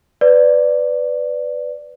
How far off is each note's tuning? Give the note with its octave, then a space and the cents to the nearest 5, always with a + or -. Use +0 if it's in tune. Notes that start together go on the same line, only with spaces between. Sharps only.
B4 +15 D5 +0